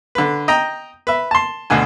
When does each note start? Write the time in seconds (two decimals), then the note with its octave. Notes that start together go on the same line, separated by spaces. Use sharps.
0.15 D3 B4
0.48 D#5 G5 A#5
1.07 B4 E5
1.31 A5 C6
1.70 D2 B2 D3 G#5